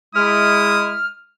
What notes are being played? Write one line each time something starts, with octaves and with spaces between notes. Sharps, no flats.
G#3 E4 D#6 F6